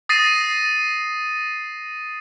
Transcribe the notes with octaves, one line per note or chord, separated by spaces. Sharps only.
D#6 A6 A#6 C7 D#7